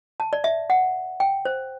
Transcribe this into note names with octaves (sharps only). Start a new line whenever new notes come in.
A5
D5
E5
F#5
G5
C5